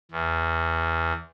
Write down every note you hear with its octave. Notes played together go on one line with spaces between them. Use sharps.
E2